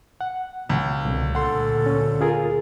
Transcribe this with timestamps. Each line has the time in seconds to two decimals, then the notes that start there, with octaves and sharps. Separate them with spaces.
0.21 F#5
0.69 C#2 B2
1.03 C2 B2 D3
1.35 D2 A#2 D3 A4 F#5 C6
1.86 C#4
2.21 F4 G#4 A#4